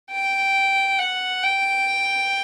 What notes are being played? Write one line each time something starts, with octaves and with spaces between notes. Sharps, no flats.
G5
F#5
G5